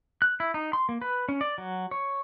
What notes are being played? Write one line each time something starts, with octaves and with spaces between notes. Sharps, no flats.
F#6
E4
D#4
C6
A#3
B4
C#4
D5
F#3
C#5